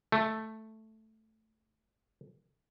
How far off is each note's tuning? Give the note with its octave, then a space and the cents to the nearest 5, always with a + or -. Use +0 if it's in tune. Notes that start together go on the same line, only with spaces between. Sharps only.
A3 +0